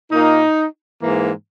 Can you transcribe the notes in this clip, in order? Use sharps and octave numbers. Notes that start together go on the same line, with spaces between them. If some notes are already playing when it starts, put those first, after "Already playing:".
A#2 A#3 D#4
G#2 E3 A#3